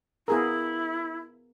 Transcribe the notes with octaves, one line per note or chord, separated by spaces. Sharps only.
B3 E4 G#4 A#4